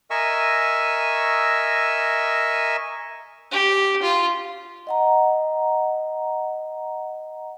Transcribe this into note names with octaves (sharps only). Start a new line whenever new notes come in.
A#4 D#5 E5 G#5 C#6 E6
G4
F4
D#5 F#5 A#5